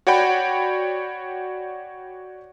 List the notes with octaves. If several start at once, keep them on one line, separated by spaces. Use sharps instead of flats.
F#4 C#5 D5 F#5 G5 B5